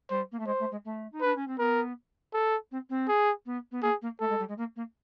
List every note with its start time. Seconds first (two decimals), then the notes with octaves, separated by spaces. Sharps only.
0.10 G3 C5
0.32 A#3
0.39 A3
0.46 G#3 C5
0.59 A3
0.71 G#3
0.85 A3
1.12 D#4
1.21 D4 B4
1.36 C#4
1.47 C4
1.58 B3 A#4
2.33 A4
2.71 C4
2.89 C4
3.08 G#4
3.46 B3
3.71 B3
3.83 A#3 G#4
4.02 A#3
4.20 A3 A4
4.29 G#3
4.39 G3
4.48 G#3
4.57 A#3
4.76 A#3